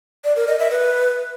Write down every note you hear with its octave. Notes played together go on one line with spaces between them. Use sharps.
D5
A#4
D#5
E5
B4